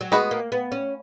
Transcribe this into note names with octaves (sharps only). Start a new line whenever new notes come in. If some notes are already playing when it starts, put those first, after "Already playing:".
F#3
G#3 B3 F#4 B4 D#5
A#3
B3
C#4